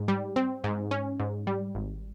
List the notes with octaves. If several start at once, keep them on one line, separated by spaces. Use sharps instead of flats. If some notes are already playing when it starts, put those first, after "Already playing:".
Already playing: G#2
G3
C4
G#2
C#4
G#2
G3
G#1